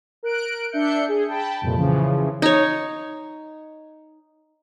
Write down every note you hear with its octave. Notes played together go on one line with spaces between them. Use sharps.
A#4 F#6 D7
D4 E5 G6 C#7
G#4
G5 A5 B5
C2 F2 A#2
C#3 E3 F3
D#4 C#5